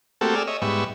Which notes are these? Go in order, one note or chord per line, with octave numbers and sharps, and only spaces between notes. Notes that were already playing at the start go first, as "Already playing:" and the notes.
A3 A#3 C4 F#4 G4 A4
G#4 D5 E6 F6
C#5 D#5 E5
G#2 G3 B3 E5 C#6